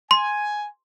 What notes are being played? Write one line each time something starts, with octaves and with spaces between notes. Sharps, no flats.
G#5 C6